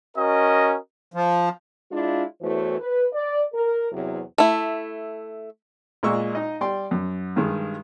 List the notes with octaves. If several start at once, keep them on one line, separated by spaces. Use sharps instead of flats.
C#4 F#4 A#4 D#5
F3
G#3 D4 E4 F4
E2 E3 A3 F#4 C5 C#5
B4
D5
A#4
E2 C3 F#3
A3 E4
A#2 G#3 D5 D#5 C#6 E6
D#4 D#5
G3 D5 G5 C6
F#2
G2 D#3 G3 G#3